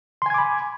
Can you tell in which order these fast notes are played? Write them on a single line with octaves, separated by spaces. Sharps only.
C6 G#5 G#6 D6 B5